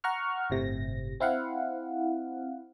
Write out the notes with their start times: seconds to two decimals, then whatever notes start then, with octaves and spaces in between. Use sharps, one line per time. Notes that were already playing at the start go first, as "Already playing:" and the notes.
0.04 F#5 A#5 C#6 F6
0.50 G1 A2 C3 A#6
1.20 C4 E4 F5 F#5